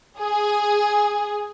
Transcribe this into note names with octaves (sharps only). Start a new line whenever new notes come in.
G#4